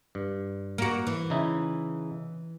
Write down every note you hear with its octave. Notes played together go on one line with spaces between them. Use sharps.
G2
A#3 F#4
E3
C#3 D#4 E4